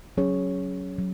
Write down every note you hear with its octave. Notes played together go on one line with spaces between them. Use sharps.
F#3 C#4 G#4 C#5
F#3